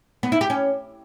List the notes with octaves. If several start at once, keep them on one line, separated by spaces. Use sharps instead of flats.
B3
E4
G4
C#4